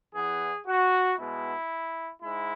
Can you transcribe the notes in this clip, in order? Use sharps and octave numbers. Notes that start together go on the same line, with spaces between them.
E2 E3 B3 G#4
F#4
B2 G#3 B3 E4
G#2 G#3 E4